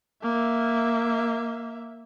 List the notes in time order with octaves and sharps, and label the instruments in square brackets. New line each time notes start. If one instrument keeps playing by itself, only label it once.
[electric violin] A#3 E5